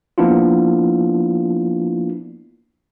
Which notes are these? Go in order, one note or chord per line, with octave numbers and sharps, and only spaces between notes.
F3 A#3 B3 D4 E4 F4